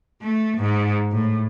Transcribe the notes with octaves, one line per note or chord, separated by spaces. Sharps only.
A3
G#2
A2